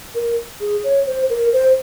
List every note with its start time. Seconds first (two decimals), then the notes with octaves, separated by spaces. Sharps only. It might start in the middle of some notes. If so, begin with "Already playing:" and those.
0.15 A#4
0.60 G#4
0.84 C#5
1.06 C5
1.30 A#4
1.53 C5